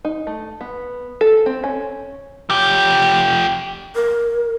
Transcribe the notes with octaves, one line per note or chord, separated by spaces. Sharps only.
D#4
A3
B3
A4
C4
C#4
F3 G4
A#4